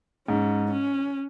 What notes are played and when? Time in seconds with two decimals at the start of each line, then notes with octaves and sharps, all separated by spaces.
0.28 G#2 C#4
0.72 C#4